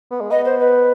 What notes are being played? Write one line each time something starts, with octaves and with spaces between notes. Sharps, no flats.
B3
G#3
B3 D#5
C5
B4